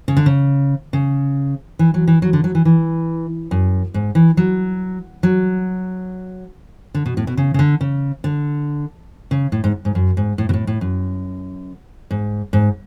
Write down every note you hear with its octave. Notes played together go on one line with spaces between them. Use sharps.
C#3
D3
C#3
C#3
E3
F#3
E3
F#3
D3
F#3
E3
E3
F#2
G#2
E3
F#3
F#3
D3
B2
A2
B2
C#3
C#3
D3
C#3
D3
C#3
A2
G#2
G#2
F#2
G#2
A2
B2
A2
A2
F#2
G#2
G#2